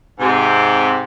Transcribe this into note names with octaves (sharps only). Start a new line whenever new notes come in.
G#2 C3